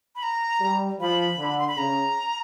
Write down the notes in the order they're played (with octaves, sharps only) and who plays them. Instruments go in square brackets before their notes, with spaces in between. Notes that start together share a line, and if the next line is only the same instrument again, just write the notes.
[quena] B5
A#5
[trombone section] G3
[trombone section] F3 [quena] B5
[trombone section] D3
[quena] C6
B5
[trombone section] C#3 [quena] A#5